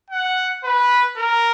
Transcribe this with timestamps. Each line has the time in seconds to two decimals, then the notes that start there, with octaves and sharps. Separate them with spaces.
0.10 F#5
0.64 B4
1.18 A#4